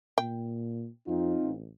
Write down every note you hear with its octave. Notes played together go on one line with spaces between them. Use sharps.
A#2 G5
F2 C4 D#4 F4
A1